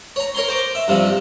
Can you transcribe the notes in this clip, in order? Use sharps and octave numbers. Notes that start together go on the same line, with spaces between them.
C#5 A#5
A#4 C#5 A#5 C6
C5 A#5 D6
E5
G2 C3 F3